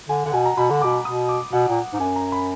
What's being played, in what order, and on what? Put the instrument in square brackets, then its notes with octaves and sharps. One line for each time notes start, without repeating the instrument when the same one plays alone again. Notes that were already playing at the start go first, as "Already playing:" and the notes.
[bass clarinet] D3 [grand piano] G#5
[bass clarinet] D3 [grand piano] F#5
[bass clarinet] B2 [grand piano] G#5
[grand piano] A#5
[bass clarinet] B2 [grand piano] B5
[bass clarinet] D3
[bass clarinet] B2 [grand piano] D6
[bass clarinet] B2 [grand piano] D#6
[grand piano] D6
[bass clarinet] B2 [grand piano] F#5
[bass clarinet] A#2
G#2
[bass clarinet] F#2 [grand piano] G#5
[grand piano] A#5
B5